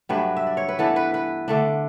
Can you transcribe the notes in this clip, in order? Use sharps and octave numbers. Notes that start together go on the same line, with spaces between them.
G2 F#3 A3 D4 B4
E5
D5
C#5
B4
E3 B3 D4 A4
B4
B4
D3 A3 D4